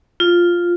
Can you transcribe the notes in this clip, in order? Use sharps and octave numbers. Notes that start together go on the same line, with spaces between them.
F4